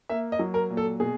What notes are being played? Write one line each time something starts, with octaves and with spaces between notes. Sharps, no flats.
A#3 E5
D#5
F#3
A#4
A#2
A4
B2 G#4